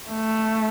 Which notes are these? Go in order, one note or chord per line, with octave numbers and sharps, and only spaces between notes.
A3